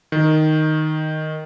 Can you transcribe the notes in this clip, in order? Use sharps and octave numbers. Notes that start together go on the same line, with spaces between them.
D#3